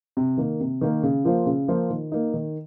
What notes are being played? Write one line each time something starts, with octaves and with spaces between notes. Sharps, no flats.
C3
D#3 A#3
C3
D#3 A#3
C#3
F3 A#3 F4 C5
C#3
F3 A#3 F4 C5
D#3
A#3 D#4
D#3